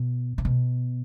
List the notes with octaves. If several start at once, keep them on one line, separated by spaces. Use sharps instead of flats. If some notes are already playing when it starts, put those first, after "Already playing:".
Already playing: B2
C3
B2